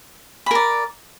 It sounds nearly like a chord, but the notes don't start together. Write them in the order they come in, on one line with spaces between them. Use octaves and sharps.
B5 A#4 D5